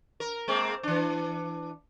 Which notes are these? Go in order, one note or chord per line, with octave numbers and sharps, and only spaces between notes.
A#4
G#3 A#3 C4
E3 D4